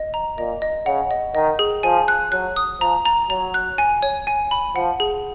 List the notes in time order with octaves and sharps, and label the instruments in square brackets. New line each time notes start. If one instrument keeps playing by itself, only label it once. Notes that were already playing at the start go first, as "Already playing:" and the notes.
Already playing: [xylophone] D#5
A#5
[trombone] A#2 [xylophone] D#5
[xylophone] D#5
[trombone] C#3 [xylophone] F#5
[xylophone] D#5
[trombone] D#3 [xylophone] D#5
[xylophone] G#4
[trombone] F3 [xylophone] G#5
[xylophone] F#6
[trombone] F#3 [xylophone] F#6
[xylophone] D#6
[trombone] F3 [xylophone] A#5
[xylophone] A#5
[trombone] F#3 [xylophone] A#5
[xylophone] F#6
G#5
C#5
G#5
B5
[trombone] F3 [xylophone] F#5
[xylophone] G#4